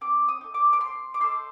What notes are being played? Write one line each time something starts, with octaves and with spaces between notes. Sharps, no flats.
C4 D6
D#6
D#4 A4
D6
D6
C4 C6
D6
D#4 A4 C6